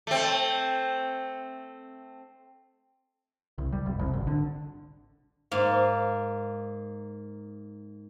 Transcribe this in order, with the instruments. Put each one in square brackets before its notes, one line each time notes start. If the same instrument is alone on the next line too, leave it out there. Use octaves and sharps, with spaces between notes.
[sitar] A3 C4
[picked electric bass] C2
G3
F1
C2
G#1
D3
[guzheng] G#2 A#3